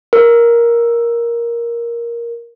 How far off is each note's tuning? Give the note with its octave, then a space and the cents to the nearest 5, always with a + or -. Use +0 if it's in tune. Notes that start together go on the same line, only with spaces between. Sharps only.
A#4 +10